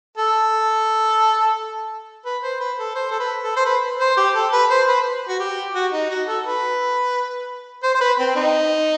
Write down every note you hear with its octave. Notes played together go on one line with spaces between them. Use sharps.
A4
B4
C5
B4
A4
C5
A4
B4
A4
C5
B4
C5
G4
A4
B4
C5
B4
F#4
G4
F#4
D#4
F#4
A4
B4
C5
C5
B4
C4
D#4